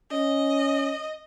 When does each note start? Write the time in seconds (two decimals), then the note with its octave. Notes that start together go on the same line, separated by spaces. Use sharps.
0.11 C#4 D#5